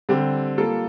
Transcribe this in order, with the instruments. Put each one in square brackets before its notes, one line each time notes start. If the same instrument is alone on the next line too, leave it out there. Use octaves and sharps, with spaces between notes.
[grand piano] D3 G3 C4 G4
G3 A#3 F4 A4